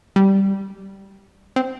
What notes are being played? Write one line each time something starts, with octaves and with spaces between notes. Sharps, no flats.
G3
C4